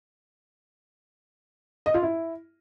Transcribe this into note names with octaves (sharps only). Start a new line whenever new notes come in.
D#5
F4
E4